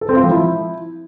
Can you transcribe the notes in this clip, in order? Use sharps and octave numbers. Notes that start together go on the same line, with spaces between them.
A4
C4
F4
F3
E4